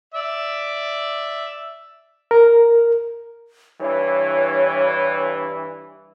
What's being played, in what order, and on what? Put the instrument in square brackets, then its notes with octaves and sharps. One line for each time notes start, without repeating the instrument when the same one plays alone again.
[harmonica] D5 E5
[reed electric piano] A#4
[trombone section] G2 E3 [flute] C#5